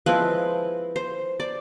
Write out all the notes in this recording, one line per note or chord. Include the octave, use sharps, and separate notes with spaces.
F3 G#3 C4 E4 B4
C5
D5